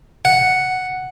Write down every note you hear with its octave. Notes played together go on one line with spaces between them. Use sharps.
F#5